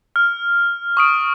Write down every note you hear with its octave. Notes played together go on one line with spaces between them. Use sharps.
F6
C#6 D#6 D7